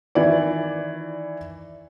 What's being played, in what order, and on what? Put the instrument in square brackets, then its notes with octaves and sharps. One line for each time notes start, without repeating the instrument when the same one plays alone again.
[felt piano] D#3 E3 E4 D5